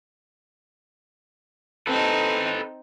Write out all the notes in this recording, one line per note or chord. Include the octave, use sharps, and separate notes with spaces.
C4 D#4 A4 B4